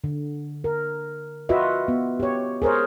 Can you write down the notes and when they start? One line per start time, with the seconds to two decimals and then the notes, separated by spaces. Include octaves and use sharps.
0.04 D3
0.64 A#4
1.49 F4 F#4 B4 D#5 E5
1.88 B3
2.20 G4 C#5
2.62 G#4 A#4 C5 C#5